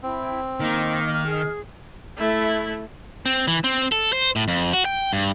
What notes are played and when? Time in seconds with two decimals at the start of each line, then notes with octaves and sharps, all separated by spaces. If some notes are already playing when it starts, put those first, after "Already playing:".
0.03 C4 E4 G5
0.60 D#3 A#3 D#5 F6
1.26 G#4
2.18 A3 E4
3.26 C4
3.48 E3
3.64 C4
3.92 A4
4.13 C5
4.36 A2
4.48 F2
4.73 F#4
4.85 G5
5.13 G2